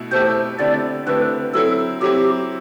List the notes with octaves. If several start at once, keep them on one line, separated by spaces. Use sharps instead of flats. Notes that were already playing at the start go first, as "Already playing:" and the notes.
Already playing: B2 A3 E4
B2 A3 E4 G4 C5
D3 A3 C4 E4 G4 D5
D3 A3 C4 E4 G4 B4
F#3 C4 E4 A4
F#3 C4 E4 G4